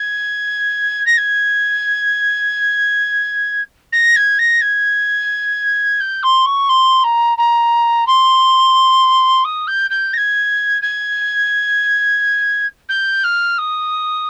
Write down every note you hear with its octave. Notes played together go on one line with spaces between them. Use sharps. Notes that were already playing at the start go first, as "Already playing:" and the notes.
Already playing: G#6
A#6
G#6
A#6
G#6
A#6
G#6
G6
C6
C#6
C6
A#5
A#5
C6
D#6
G6
G6
A#6
G#6
G#6
G6
F6
D#6